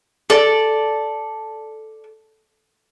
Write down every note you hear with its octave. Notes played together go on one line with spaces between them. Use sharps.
A4 D5